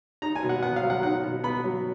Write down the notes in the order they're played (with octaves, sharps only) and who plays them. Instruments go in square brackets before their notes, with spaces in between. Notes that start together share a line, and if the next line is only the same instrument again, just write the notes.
[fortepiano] D#4 A#5
G#5
B2
F#5
B3 F#5
F5
F#3
F#5
D#4 F#5
B2
B3 B5
F#3